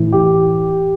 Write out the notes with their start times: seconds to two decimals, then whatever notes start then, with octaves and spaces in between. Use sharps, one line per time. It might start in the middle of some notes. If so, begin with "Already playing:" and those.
Already playing: A2 E3
0.12 G4